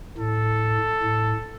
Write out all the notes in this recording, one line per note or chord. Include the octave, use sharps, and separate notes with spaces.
A2 A4
A2